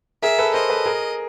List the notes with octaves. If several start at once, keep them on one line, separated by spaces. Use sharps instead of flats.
G#4 A#4 E5
A4 B4
A#4 C5 D#5
A4 B4
G#4 A#4